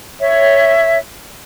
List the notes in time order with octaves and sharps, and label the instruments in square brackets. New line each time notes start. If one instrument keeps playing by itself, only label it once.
[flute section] C#5 E5